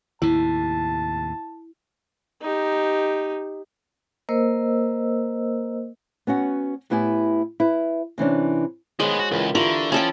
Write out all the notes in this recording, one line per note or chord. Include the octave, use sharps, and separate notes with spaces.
D#2 A2 C3 E4 A5
D#4 G4
A#3 A#4 C5 D#5 E6
B3 C#4 F#4 F#5
A2 B3 E4 G4 G#5
E4 B4
C3 E3 C#4 D4
D#3 G#3 B3 C5 C#5
F#4
C#2 E3 F4 A4 A#4
D3 E3 E4 F4 G4 A#4 E5 C#6
F3 C#4 A4 G5 B5